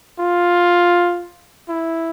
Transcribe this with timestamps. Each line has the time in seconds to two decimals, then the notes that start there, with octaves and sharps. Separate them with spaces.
0.19 F4
1.69 E4